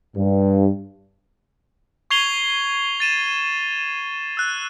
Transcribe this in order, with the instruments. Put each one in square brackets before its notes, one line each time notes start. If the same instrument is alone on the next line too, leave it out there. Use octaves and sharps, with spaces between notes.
[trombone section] G2
[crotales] C#6 G#6 C7 F7 G7
A6 D#7 E7
E6 F#6